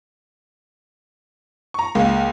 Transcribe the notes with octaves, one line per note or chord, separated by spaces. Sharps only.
A#5 C#6
C#2 G#3 A#3